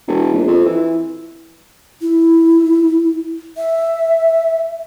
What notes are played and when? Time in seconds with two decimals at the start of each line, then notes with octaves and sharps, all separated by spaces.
0.07 E1
0.34 A#1
0.48 F2
0.65 E3
2.02 E4
3.57 E5